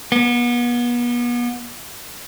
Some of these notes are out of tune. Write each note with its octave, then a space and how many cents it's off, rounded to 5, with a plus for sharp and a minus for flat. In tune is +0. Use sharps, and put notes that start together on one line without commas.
B3 -35